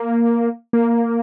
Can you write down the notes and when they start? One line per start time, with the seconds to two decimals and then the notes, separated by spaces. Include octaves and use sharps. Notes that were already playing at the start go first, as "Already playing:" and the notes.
Already playing: A#3
0.73 A#3